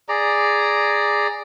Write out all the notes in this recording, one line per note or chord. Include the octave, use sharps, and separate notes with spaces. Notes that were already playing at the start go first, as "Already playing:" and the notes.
G#4 D5 A#5